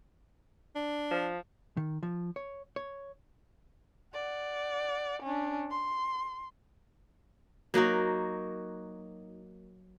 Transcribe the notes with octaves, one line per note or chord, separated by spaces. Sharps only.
D4
F3
D#3
F3
C#5
C#5
D5 F#5
C#4 D4
C6
F#3 A#3 D#4 F#4